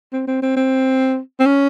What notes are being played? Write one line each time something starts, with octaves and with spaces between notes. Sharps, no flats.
C4
C4
C4
C4
C4
C#4